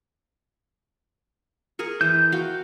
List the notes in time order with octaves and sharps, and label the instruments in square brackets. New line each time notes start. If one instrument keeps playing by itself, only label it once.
[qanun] G#4 A#4 C#6
[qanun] E3 G#4 C5 [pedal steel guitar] G6
[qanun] F#4 F5 G5